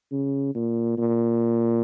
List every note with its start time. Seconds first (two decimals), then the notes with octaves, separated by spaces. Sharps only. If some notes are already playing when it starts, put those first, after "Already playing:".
0.12 C#3
0.55 A#2
0.98 A#2